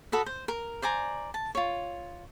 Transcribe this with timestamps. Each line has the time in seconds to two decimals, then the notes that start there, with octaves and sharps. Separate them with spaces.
0.12 F#4 A4 B4 D#5
0.26 C5
0.48 A#4
0.82 C5 D5 G#5 A#5
1.34 A5
1.55 F4 C#5